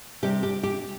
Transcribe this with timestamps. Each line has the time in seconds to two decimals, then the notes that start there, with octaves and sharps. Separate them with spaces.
0.23 C3 G3 G4
0.43 G4
0.63 G4